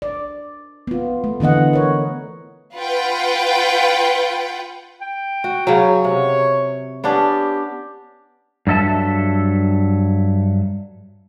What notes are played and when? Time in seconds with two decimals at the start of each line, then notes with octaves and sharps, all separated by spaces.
0.02 D5
0.87 B3 F4
1.24 A3
1.40 D3 E3 B3 D#5 F#5
1.73 A#4 C#5
2.75 F4 B4 F#5 G5
5.01 G5
5.44 F#4
5.67 C#3 F#3 C#5
6.04 C3
7.04 B3 C#4 D4 G4
8.67 G2 F#3 A4 E5 A5